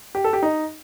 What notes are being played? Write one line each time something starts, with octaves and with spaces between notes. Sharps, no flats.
G4
A4
G4
D#4